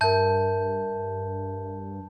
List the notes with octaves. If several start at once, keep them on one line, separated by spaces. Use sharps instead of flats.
G2 A#4 E5 A5 G6